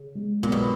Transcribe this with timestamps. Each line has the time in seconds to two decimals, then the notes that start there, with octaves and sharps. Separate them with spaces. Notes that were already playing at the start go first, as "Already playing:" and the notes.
Already playing: C#3
0.15 G#3
0.43 B1 A#2
0.52 B2